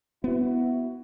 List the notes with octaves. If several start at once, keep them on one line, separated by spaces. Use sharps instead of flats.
B3 E4 F#4